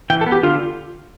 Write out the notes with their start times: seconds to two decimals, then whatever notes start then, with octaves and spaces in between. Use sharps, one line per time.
0.10 E3 G5
0.21 A4
0.26 B3
0.32 G4
0.43 D3 F4